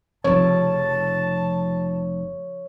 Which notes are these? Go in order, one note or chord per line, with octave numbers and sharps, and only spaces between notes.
F1 C#3 F3 C#5 A5